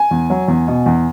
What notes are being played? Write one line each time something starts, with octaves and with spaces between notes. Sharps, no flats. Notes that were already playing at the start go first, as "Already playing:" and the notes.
Already playing: G#5
E2
F#3
E2
B2
E2